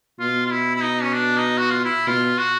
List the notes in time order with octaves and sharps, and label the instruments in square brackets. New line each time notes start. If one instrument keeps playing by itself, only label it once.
[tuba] B2 [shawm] F4
[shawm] F4
E4
E4
D#4
C#4
D4
D#4
F#4
F4
E4
[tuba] B2 [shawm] F4
[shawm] F#4